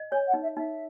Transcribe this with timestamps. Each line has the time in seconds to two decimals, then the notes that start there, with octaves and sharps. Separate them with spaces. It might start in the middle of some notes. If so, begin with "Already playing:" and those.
Already playing: D#5
0.12 C#5 G#5
0.27 F#5
0.34 D#4
0.42 E5
0.56 D#4 E5